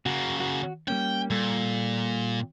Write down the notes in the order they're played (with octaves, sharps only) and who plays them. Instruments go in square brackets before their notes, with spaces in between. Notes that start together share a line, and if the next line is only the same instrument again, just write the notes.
[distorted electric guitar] C#3 A#3 [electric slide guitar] F#4
[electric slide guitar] F#4
[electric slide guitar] G3 A#3 C#4 [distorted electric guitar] G5
[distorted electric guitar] A#2 [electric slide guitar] G3 A4